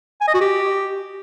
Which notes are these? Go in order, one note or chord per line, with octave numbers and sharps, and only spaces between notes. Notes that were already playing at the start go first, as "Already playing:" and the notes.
G#5
D#5
F#4
G4